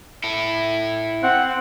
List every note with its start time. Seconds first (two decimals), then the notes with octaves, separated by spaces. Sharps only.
0.24 E4 A4
1.23 C4 F#5